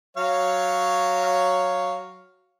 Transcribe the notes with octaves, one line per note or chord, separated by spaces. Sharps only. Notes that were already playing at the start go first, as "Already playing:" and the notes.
F#3 C#5 F5